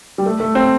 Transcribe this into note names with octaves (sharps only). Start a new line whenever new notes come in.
G3
A3
A3
C4